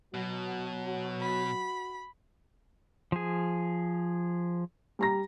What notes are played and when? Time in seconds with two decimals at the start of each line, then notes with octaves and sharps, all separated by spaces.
0.14 B2 F#3 F#4
1.21 B5
3.12 F3 G#4
4.99 G3 A#5 A#6